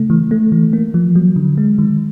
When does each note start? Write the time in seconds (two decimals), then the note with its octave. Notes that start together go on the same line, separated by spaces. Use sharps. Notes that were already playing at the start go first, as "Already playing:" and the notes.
Already playing: C#3 A3
0.10 E3
0.31 A3
0.52 E3
0.73 A#3
0.94 F3
1.16 F#3
1.36 D3
1.58 G#3
1.78 D#3